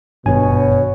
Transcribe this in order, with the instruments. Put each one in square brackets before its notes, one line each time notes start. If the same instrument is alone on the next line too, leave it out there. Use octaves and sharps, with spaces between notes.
[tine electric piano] G#1 G2 G#5 [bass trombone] B2 [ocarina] C#5